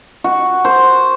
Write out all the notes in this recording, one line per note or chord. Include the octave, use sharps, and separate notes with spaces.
F#4
C5